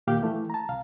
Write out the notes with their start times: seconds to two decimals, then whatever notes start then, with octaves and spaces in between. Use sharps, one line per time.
0.07 D#2 A#2 G4 F5 G6
0.22 E3 A3 E4
0.50 A5 A#5
0.69 C2 F5